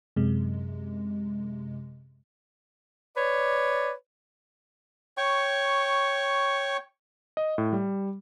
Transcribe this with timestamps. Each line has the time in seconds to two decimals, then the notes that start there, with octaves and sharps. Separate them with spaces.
0.16 F#2 C3 G#3
3.16 B4 C#5 D5
5.17 C#5 G5 C#6
7.37 D#5
7.58 A2
7.73 G3